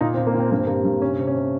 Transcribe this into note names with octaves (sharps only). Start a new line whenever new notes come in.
A#2 D#4
C4
A#2
A#3
A#2 C4
G2 A#3
C4
G3 A#3
G2
C3 C#4
C3
C#4
C3